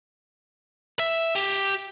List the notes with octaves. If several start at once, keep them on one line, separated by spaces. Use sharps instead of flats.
E5
G4